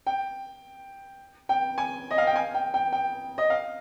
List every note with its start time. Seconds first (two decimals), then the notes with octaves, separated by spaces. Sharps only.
0.07 G5
1.49 G5
1.78 G#5
2.11 D#5
2.18 F5
2.27 G5
2.36 G#5
2.54 G5
2.74 G5
2.92 G5
3.38 D#5
3.50 F5